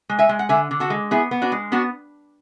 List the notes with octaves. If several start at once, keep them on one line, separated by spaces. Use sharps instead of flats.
G#3
E5 G#5
G#3
F#5
D3 E5 G#5
D3
F#4 A4
G#3
B3 E4 G#4
B3
D4 F#4
G#3
B3 D4 F#4